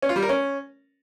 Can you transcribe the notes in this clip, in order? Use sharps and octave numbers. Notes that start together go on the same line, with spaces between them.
C#4
F4
G3
A#4
C#4